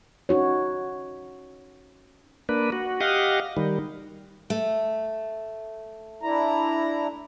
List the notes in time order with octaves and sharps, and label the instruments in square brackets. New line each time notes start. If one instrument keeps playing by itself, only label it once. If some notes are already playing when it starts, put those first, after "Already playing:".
[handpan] C#4 D#4 F#4 C#5
[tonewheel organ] A#3 D4 B4
F#4
G4 D#5 F5 F#5
D#3 G3
[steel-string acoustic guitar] A3
[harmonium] D4 E4 A#5